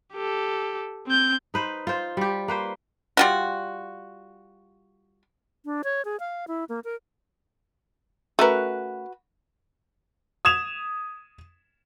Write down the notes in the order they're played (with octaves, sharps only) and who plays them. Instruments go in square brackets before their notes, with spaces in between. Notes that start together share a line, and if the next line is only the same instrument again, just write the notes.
[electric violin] G4 A4
C4 G6
[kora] D#4 B4 C5
F4 C5
G3 G4
A#3 B4 C5
[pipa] G3 F4 F#4
[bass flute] D4
C#5
G#4
F5
E4
A#3
A#4
[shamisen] A3 C#4 A#4 [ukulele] F#4 B4
[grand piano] D#6 G#6 E7 F7